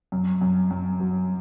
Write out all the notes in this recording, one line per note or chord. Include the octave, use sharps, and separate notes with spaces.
F#2
F#2
F#2
F#3